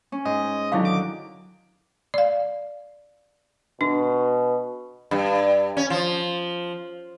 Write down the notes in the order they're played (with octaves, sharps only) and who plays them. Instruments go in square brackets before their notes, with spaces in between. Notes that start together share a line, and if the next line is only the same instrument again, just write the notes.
[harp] C#4
[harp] G#2 [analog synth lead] D#5
[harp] D3 D#3 F#3 [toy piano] E4 F5
[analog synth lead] D6
[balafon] D5 F5
[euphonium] B2 [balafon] D4
[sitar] G2
C#4
F3